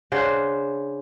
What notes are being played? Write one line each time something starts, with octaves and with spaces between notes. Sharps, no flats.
C#3 D4 C5 F#5